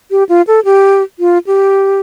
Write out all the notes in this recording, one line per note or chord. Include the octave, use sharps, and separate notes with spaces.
G4
F4
A4
G4
F4
G4